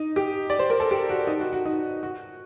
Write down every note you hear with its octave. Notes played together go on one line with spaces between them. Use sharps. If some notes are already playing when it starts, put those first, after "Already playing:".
Already playing: D#4
G4
D5
C5
A#4
A4
G4
F#4
D#4
F#4
F#4
D#4
F#4